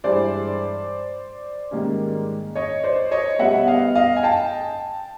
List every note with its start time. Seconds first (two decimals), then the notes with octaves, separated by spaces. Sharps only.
0.04 G2 E3 G#3 C5 D5
1.71 G#2 D#3 G3 A#3 C#4
2.55 C#5 D#5
2.84 C5 D5
3.11 C#5 D#5
3.39 B2 G3 B3 E5 F#5
3.68 D#5 F5
3.95 D#5 F5
4.16 G#5
4.23 G5 A5